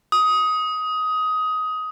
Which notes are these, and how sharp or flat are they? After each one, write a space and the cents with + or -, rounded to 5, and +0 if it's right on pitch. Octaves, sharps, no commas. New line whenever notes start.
D#6 +15